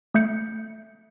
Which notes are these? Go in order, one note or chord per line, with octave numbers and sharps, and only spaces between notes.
A3 E5 G6 C#7